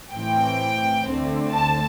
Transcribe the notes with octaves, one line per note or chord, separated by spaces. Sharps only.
A2 E3 C4 G5
D2 D3 A3 C4
A5